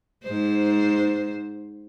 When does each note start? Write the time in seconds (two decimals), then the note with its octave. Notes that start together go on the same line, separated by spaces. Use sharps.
0.24 G#2 C5